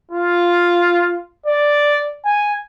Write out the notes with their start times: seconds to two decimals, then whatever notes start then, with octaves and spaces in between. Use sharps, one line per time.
0.11 F4
1.46 D5
2.24 G#5